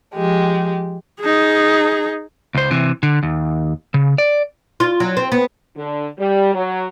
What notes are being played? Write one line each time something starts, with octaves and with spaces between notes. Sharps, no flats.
F3 G#3 G4
D#4 G#4
C#2 C5
C3 E3
D3
D#2
C#3
D5
F4
F#3
C4
B3
D3
G3
F#3